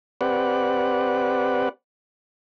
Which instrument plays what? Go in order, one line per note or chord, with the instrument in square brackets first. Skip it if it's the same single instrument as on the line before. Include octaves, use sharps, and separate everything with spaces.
[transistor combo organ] C4 G4 B4 D5 F#5